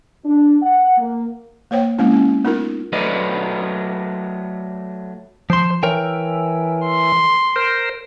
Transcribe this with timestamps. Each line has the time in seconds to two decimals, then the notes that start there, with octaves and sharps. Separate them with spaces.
0.25 D4
0.62 F#5
0.98 A#3
1.71 A#3 C5 C#5 G5
1.98 G#3 A#3 C4 C#4 E4
2.13 C#4
2.45 B3 D#4 F4 A#4
2.92 F#3 A3 F#4 B4 D5 D#5
5.50 F3 C5 C6
5.83 E3 A#4 C#5 G5
6.86 C6
7.56 A#4 C5